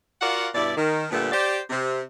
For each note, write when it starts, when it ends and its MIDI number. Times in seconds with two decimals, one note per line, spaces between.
0.20 0.47 65
0.20 0.47 66
0.20 0.47 70
0.20 0.47 74
0.20 0.47 77
0.20 0.47 78
0.55 0.74 43
0.55 0.74 47
0.55 0.74 64
0.55 0.74 74
0.76 1.06 51
1.11 1.31 46
1.11 1.31 50
1.11 1.31 55
1.11 1.31 57
1.11 1.31 59
1.32 1.59 67
1.32 1.59 72
1.32 1.59 74
1.70 2.01 48